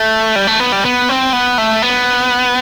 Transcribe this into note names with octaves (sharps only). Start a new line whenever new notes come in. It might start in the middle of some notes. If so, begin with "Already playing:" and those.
Already playing: A3
G3
A3
B3
G3
B3
C4
B3
A3
B3